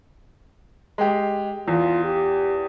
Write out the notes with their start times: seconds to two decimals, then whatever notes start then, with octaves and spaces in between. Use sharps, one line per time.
0.98 G#3 G4
1.68 E2 F4
2.04 G4